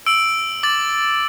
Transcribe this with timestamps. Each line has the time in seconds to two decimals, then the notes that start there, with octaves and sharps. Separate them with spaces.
0.06 E6 D7 F#7
0.63 D6 A6 F#7